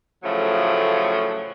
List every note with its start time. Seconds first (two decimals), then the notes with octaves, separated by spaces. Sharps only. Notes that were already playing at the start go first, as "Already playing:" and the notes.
0.23 A2 C#3 F3 F#3 A3